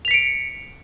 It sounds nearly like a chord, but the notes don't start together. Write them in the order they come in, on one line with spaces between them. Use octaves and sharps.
F7 B6 C#7 D7